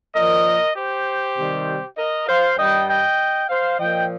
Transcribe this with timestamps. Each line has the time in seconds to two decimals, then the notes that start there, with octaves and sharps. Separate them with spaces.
0.15 A#2 F3 A#4 D#5
0.76 G4 C5
1.37 C3 D#3 G3
1.97 A#4 D#5
2.27 C5 F5
2.58 G2 G3 D#5 G5
2.88 D#5 G5
3.49 C5 F5
3.79 A#2 F3 D#5 G5